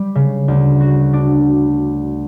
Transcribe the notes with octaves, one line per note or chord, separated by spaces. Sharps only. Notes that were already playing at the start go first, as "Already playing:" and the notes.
Already playing: G3
C#3
D2
F#4
D4